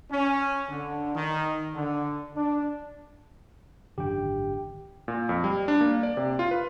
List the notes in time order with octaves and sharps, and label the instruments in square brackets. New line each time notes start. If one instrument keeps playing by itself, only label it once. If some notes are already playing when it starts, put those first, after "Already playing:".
[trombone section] C#4
D3
D#3
D3
D4
[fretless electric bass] G#1 F#2 D3 [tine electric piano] G4 G5
[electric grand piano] A#2
F2
G3
D4
A#3
D5
C3
F4
B4